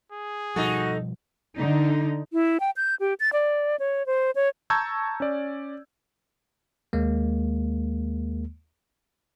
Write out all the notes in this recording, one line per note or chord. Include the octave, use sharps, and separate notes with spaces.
G#4
B2 F3 G3 D#4 F#4 A4
D3 D#4
E4
G5
G6
G4
A6
D5
C#5
C5
C#5
A5 A#5 C#6 E6 G6 G#6
C#4 D5
D#2 G#3 A#3